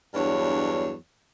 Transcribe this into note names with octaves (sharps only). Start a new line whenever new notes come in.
E2 G2 F#3 D4 C#5